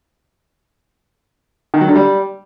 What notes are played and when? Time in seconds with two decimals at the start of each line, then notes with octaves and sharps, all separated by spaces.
1.74 D#3
1.81 F#3
1.88 D3
1.96 G3